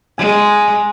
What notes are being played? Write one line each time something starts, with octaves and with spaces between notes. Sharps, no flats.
G#3 G#5